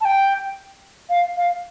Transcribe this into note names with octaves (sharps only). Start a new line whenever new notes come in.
A5
G5
F5
F5